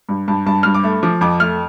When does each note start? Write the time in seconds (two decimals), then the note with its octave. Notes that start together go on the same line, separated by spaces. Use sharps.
0.09 G2
0.28 G2 A5
0.46 G2 A5
0.63 G2 F6
0.74 D6
0.84 A3
1.03 F3 D6
1.21 F2 D6
1.40 A3 F6